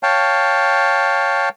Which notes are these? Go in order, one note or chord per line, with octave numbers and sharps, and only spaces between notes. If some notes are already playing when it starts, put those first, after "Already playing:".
C#5 F5 G5 A5